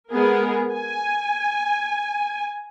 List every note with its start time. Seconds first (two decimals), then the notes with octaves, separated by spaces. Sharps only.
0.11 G#3 B3 G#4 A#4
0.73 G#5